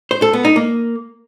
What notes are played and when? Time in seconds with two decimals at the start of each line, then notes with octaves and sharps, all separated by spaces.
0.11 C5
0.22 A4
0.33 B3
0.45 D#4
0.56 A#3